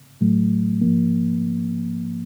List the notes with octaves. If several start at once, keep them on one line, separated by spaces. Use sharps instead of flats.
A2 F#3 A3
G#2 F3 A#3